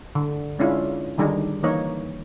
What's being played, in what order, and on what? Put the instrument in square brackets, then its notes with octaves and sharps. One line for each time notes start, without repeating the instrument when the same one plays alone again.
[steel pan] D3
G#3 C#4 D4 E4 F4
D3 D#3 G3 D4 D#4 G#4
E3 A#3 D#4 C#5